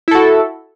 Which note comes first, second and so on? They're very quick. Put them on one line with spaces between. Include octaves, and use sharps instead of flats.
E4 A4 F#4